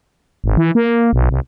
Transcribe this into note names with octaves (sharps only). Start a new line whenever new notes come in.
G#1
E3
A#3
B1
C2